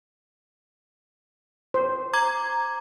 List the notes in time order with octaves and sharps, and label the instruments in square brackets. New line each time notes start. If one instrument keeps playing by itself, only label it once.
[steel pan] C5
[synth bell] A#5 D6 G#6